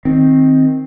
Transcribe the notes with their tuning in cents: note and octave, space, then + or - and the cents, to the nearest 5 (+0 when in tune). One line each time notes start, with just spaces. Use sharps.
D#3 +10 C4 +5